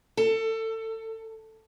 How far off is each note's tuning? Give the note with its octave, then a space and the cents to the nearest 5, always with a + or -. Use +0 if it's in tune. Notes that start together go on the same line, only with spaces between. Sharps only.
A4 +25